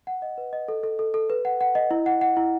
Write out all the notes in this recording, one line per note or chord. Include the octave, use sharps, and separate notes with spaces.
F#5
D#5
B4
D#5
A4
A4
A4
A4
B4
F#5
F#5
D#5
E4
F#5
F#5
E4